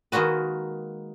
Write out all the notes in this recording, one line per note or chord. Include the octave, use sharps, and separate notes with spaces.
D#3 G#3 A#3 F#4 B4